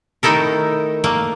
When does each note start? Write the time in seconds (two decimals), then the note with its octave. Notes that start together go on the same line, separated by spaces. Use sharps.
0.23 D#3 A3 D#4 E4 A4 A#4
1.04 A3 A#3